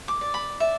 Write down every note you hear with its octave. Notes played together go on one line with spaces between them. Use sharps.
D6
D5
B5
D5 E5